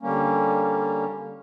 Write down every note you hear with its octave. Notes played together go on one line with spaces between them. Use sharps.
D3 G3 A#3 C#4